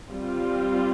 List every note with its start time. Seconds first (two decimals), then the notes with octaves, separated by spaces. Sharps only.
0.10 G3 C4 F4